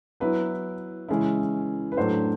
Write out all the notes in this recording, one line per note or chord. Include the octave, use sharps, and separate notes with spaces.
F#3 B3 E4 B4
C#3 E3 G#3 C#4 E4
B4
A2 F#3 A3 D4 C5